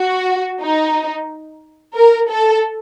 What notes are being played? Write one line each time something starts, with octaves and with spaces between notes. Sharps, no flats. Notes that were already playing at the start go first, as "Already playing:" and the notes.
Already playing: F#4
D#4
A#4
A4